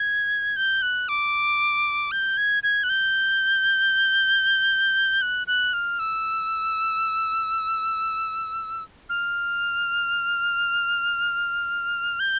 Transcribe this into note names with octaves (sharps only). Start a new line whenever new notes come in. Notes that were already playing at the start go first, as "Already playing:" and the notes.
Already playing: G#6
G6
F#6
D6
G6
G#6
G#6
F#6
G6
F#6
F#6
F6
E6
F6
G6